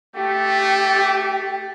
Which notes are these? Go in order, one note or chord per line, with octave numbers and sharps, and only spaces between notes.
A3 G4